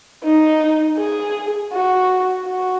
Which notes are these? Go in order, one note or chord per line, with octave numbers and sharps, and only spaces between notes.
D#4
G#4
F#4
F#4